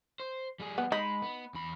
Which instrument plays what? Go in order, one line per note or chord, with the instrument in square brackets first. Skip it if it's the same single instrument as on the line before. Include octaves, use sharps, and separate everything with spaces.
[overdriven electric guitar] C5
G3 G#4
[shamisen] B3
[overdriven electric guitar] G#3 [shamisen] D#4 [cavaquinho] B5
[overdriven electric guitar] B3
E2 B5